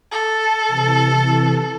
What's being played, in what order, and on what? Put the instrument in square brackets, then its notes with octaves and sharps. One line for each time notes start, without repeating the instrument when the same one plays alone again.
[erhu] A4
[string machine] C3 E3